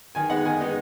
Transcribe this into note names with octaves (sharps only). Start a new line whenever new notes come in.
D#3 G#5
G#3 B3 D#4 F#5
D#3 G#5
G#3 B3 D#4